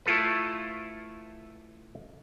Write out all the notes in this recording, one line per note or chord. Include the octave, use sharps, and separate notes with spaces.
A3 E4 F4 A4 B4